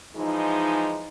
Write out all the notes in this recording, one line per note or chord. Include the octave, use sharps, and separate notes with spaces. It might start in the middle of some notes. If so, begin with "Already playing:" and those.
E3 F3 G#3 D#4